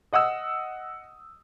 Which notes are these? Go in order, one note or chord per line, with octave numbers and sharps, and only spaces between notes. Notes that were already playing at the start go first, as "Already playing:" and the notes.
D#5 F#5 D#6 E6